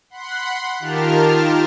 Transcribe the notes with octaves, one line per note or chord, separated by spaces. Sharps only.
F#5 B5 C6
D#3 F4 G4 A#4 A5 F6